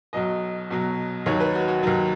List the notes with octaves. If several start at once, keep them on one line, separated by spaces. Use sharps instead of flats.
B1 B2 F#3 D#5
B1 B2 F#3
D#2 D#3 F#3 C#5
B4
F#4
F#4
D#2 D#3 F#3